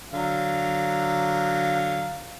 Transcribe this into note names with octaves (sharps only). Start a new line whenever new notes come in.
D3 F#3 F5